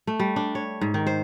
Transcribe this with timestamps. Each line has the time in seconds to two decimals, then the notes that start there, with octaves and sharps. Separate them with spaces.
0.07 A3
0.20 G3
0.36 D4
0.55 C#5
0.81 G#2
0.94 D#3
1.07 C5